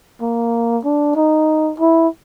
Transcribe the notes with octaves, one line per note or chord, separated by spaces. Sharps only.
A#3
D4
D#4
E4